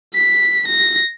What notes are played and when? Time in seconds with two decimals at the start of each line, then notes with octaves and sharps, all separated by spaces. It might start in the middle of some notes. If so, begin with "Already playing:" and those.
0.14 B6
0.68 A#6